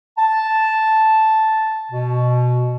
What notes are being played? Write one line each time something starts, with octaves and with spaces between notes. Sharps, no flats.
A5
B2